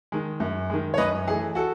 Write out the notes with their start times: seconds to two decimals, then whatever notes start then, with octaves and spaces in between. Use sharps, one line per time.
0.12 D#3 G#3
0.40 F#2
0.70 D#3 G#3
0.94 C#5
0.98 F#2 B4 D#5
1.27 E3 A3 G#4
1.55 F#4 A4